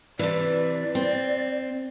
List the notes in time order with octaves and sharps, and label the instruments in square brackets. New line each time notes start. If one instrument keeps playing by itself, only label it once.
[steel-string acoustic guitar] C3 E3 [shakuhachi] D5
[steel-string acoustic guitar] C4